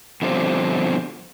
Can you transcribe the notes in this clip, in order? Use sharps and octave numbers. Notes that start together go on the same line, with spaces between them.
B2 D3 F3 G3 A#3 C4